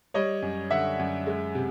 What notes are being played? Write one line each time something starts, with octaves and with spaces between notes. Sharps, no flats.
G3 C#5 D#5
F#2
D3 E5 F#5
F#2
G#3
C3